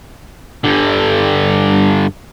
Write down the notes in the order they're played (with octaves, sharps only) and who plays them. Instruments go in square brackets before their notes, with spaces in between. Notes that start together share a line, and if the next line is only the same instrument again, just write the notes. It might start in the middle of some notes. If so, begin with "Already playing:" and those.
[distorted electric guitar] G2 D3